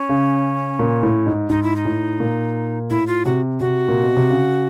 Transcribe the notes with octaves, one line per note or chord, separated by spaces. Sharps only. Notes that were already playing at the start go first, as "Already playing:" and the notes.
Already playing: C#4
C#3
A#2
A2
G#2
G#2 D#4
E4
D#4
A2
A#2
A2 E4
F4
C3 F#4
C3 F#4
A#2
B2
C3
C#3